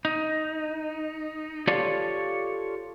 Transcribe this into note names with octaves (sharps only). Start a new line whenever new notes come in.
D#4
F4 G4 A4 C#5 D5 F5